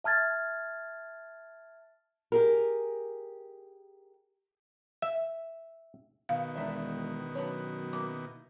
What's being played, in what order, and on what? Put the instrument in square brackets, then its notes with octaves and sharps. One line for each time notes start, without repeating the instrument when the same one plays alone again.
[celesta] E5 A5 F6 G#6 A6
[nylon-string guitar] G4 G#4 A#4
[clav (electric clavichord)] E5
[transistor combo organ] B2 D#3 [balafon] F5
[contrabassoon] E1 [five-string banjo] D4 D#4 E5
[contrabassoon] F#2 [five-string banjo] B3 D4 C#5
[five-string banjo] A#3 E4 [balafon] D6